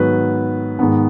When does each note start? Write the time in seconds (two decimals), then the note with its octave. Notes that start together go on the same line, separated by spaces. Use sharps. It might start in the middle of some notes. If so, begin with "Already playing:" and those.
Already playing: G#2 D#3 F#3 B3 F#4 B4
0.79 G#2 D#3 B3